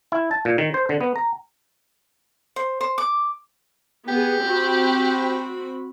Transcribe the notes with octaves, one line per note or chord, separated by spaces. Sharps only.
E4
A5
A#2
D#3
C5
D3
B3
A#5
C5
C5
D6
B3 G4 G#4
C4 F#4 B5